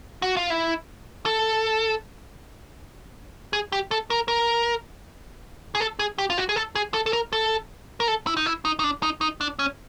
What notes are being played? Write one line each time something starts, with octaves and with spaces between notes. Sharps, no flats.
F#4
F4
E4
A4
G#4
G4
A4
A#4
A#4
G#4
A4
G#4
G4
F4
F#4
G#4
A4
G#4
A4
A4
A#4
A4
A#4
A4
E4
D#4
E4
D#4
D#4
D4
D#4
D#4
D4
C#4